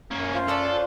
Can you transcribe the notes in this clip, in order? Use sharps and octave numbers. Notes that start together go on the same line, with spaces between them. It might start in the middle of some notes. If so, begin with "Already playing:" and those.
F#2 A#3 C#4
F4 C5
C#4 D4 A4 D5